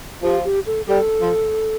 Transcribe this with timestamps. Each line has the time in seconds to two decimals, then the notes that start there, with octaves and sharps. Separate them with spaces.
0.23 F3 G4
0.45 G4
0.66 A4
0.87 G3 A4
1.20 F3